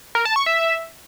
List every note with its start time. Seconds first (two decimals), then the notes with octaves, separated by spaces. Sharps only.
0.15 A#4
0.25 A5
0.36 C#6
0.46 E5